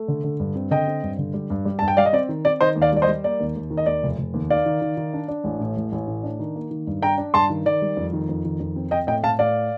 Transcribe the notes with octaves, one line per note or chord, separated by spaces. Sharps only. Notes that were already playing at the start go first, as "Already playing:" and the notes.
Already playing: A3
D3
D3
G2
C4
D3 D#5 G5
C4
G2
D3
G3
G2
G3
G2 A5
G5
G3 D5 F5
D#5
C4 D5
D#3
C4 D5
D#3 C5 D#5
D#2
D5 F5
G3 D5
C5 D#5
G3
A#3 D5
D#2
D#2
D#3
D#5
D#2 D5
F1
F1
D#2
D#3 D5 F5
D#3
D#3
D#3
D4
D4
A1
A2
A1
A1
A2
D4
D#3
A#3
D#3
G2
D4 G5 A#5
D4
G2 A5 C6
D#3
D#3 D5
G3
F2
D#3
F2
D#3
F2
C4
C4 D#5 G5
A2 D#5 G5
A2 F5 A5
A2 D5 F5